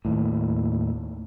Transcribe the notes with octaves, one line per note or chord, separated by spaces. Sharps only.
D#2 A2